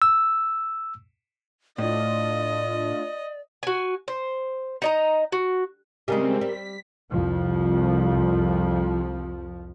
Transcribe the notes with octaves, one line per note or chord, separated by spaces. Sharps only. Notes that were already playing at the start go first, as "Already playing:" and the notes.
E6
A2 A3 D4 F4 D5 D#5
F#4 G#5
C5
D#4 D#5 A#5
F#4
C#3 G3 G#3 C4 G4 A#4
G3 B6
C2 F2 F3